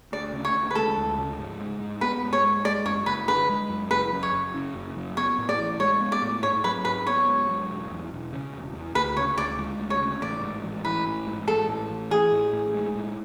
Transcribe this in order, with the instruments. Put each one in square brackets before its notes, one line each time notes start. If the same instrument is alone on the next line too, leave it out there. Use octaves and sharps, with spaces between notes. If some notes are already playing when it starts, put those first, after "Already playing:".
[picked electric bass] D2 [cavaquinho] D5
[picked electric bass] C#3
[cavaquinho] C#5
[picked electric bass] D2
[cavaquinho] B4
[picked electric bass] G#3 [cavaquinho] A4
[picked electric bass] D2
C#3
G#2
G#3
G#2
[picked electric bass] B3 [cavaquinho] B4
[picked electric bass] G#2
[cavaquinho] C#5
[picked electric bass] G#3
[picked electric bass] G#3 [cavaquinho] D5
[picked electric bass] F#2 [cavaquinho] C#5
[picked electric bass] F#1 [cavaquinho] B4
[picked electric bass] D3 [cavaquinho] B4
[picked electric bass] G#3
F#2
[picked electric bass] F#1 [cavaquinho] B4
[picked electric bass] F#2
[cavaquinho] C#5
[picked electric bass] F#1
C#3
F#1
F#2
[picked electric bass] B3 [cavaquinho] C#5
[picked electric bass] A2
[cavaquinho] D5
[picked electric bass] A1
[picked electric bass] G#3 [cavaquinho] C#5
[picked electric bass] B3
[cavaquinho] D5
[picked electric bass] A2
[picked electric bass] G#2 [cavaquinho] C#5
[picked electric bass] F#3 [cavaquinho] B4
[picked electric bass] G#2 [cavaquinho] B4
[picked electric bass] B3 [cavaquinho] C#5
[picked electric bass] G#2
F#3
E1
E2
E1
C#3
E1
E2
[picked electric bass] D2 [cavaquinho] B4
[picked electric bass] C#3 [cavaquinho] C#5
[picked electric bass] D2 [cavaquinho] D5
[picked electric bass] G#3
D2
[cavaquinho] C#5
[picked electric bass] C#3
[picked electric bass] A1 [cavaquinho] D5
[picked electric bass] G#2
A1
[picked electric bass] E3 [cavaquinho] B4
[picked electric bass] A1
G#2
[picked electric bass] A1 [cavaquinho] A4
[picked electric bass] A2
A1
[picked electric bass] E3 [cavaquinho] G#4
[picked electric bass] A1
A2
G#3
A2